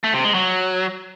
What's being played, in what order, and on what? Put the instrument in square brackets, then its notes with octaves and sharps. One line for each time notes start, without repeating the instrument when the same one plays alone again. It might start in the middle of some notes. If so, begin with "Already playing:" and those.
[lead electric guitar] A3
C3
G#3
F#3